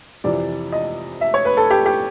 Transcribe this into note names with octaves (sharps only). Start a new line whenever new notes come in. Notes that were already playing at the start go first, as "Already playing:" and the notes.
F2 C3 E3 D5
D#5
E5
C#5
B4
A4
G4
G4